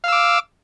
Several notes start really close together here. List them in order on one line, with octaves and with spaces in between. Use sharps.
F5 E6 D6